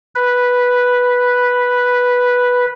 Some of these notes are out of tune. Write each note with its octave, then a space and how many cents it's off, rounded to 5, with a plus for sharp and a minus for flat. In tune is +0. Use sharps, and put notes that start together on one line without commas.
B4 -5